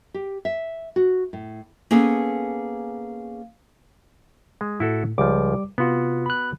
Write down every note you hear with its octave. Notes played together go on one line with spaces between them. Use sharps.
G4
E5
F#4
A2
A#3 B3 C#4 G#4 A4
G#3
A2 E4 F#4 A4
C#2 F3 G3 D6
C3 B3 F4 F#4
B5 F#6